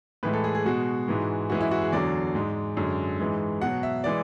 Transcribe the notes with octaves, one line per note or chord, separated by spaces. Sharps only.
A2 E3 G#3 B4
A4
G#4
G#4
B2 G#3 F#4
G#2 E3 G#3
F#2 E3 G#3 F#4
E4
F#4
G#4
E2 D3 F#3 D5
G#2 G#3
F#2 D3 G#3
G#2 E3 G#3
B2 F#3 F#5
E5
E3 G#3 D5